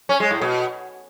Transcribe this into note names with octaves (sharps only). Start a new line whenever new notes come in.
C#4
G#3
A2
B2